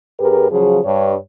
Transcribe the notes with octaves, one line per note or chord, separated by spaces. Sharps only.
F#2 G4 G#4 A#4 B4
C#3 F3 F#3 G#4
G2 C#5